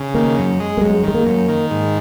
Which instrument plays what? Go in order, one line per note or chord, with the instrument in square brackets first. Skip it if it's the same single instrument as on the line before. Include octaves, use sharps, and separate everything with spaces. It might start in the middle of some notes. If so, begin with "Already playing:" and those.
Already playing: [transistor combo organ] C#3
[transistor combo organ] D#3 [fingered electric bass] A#3
[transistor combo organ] F#2
G#3
[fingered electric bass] A#3
[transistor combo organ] F#2 [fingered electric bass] G#3
[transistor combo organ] D#3 [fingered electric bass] G#3
[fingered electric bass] A#3
[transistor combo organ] F#2
D#3
G#2